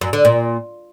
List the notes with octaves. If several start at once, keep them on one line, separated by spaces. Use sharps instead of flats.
F#2
D3
A#2